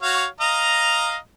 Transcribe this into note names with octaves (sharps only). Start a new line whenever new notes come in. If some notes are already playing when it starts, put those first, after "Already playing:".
F#4 C#5 F5
D#5 F5 A#5